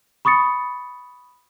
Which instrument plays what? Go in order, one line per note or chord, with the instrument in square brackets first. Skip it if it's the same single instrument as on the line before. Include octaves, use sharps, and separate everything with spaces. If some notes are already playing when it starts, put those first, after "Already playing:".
[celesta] B5 C#6 D#6 A6 C#7